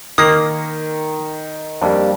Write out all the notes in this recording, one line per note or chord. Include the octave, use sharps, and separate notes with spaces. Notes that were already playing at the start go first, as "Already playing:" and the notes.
D#3 A#3 D#6
F2 G3 A#3 D4